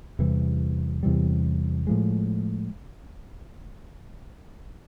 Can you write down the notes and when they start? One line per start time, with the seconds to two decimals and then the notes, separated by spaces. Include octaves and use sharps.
0.19 E2 C3 E3 G3
1.03 E2 C3 E3 G3
1.87 A2 F3 G#3